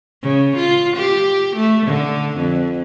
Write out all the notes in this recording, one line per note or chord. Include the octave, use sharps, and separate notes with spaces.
C#3
F4
G4
A3
D3
F2